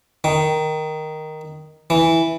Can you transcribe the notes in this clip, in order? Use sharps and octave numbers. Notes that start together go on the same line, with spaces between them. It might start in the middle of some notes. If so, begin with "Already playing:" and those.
D#3
E3